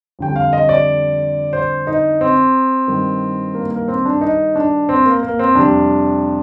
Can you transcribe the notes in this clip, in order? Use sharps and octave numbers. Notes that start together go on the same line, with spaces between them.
F2 D3 G3 G5
F5
D#5
D5
C5
D#4
C4
G2 D#3 G3
A#3
A#3
C4
D4
D#4
D4
C4
A#3
A#3
C4
F2 C3 G3 D4